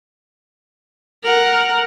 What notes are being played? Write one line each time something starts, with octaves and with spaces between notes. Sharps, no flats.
A#4 F#5